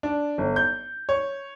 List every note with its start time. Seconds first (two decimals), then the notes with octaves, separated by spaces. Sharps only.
0.03 D4
0.38 G1
0.56 G6
1.09 C#5